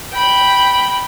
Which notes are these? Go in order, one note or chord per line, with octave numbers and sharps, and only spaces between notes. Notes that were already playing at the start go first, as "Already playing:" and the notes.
G5 B5